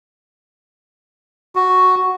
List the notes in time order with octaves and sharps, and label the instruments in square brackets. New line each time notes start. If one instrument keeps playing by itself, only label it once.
[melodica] F#4